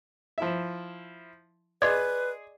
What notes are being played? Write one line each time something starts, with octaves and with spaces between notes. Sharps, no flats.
F3 E4 E5
G#4 B4 D5 D#5 C6 D6